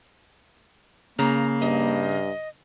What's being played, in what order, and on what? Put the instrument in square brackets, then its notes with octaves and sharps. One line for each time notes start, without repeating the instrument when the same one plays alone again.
[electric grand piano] C#3 [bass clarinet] A#3 [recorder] A#5
[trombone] G2 [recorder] D#5